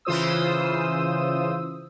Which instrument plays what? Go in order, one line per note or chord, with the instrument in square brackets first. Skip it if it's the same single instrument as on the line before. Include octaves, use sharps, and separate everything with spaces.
[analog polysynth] C#3 E3 F4 C5 D#6 E6